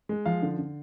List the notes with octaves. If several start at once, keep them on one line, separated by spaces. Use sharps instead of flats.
G#3
F3 F5
D3
D3